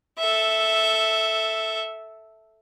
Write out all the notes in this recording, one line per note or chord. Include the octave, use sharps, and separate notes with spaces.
A4 E5